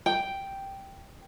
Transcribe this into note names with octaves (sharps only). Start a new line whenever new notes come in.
G5